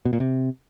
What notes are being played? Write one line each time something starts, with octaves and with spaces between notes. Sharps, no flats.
B2
A#2
C3